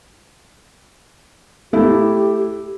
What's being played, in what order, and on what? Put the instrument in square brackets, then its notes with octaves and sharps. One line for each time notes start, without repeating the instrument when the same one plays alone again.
[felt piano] A3 E4 [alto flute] G4